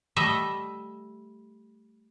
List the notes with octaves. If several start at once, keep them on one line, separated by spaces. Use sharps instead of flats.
G3 A3 D#5 E5